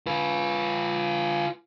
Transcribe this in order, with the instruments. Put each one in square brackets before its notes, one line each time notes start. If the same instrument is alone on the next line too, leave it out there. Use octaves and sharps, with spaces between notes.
[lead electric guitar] F4 B4